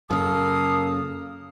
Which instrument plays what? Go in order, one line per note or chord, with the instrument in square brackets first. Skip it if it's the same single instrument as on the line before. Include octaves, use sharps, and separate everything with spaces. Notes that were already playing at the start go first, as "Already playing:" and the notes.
[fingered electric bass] F#2 C#3 [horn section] A#3 A4 F5 [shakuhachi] D#6